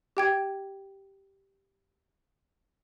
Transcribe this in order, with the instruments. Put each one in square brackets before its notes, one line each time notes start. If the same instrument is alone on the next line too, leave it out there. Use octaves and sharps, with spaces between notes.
[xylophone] G4 G5 G#6